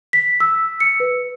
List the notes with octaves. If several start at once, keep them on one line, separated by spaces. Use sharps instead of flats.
B6
E6
C#7
B4